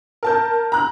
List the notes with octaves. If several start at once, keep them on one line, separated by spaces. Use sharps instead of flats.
A#4 A5 G6
A#5 F#6